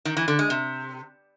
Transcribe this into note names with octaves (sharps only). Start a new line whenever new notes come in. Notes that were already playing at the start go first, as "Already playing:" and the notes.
D#3
E3
D3
G#3
C3